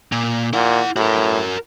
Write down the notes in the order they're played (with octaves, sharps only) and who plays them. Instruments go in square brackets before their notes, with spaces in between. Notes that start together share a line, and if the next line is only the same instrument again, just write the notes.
[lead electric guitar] A#2
[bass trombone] A#2 [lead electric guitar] E4 F#5
[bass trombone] A2 [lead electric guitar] F#4 A#4